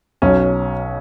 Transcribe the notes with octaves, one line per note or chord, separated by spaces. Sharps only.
B1 B2 F#3 C#4